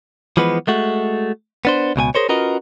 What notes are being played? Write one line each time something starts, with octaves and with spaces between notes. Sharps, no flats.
E3 F3 G#3 B3 B4
G#3 A3 F#4
B3 D4 C5
C#2 B2 G4 G#5
G#4 A#4 C5 C#5
C#4 F4 F#4 A#4 B4 D#5